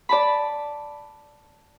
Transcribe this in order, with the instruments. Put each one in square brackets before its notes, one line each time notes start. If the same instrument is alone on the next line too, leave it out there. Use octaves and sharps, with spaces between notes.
[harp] D5 A5 B5